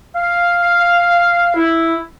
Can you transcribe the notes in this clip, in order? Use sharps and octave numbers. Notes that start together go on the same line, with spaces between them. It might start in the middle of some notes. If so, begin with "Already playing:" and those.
F5
E4